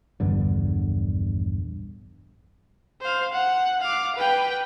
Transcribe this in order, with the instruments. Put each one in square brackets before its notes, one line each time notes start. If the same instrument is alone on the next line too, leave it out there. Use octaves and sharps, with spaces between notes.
[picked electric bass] A#1 E2 G2 D3
[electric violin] C5 F5
F#5
F5 D6
B4 G5